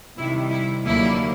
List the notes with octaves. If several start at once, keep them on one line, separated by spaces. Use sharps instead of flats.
C3 D#3 G3 E4
E4
D#2 D3 F#3 A#3 E4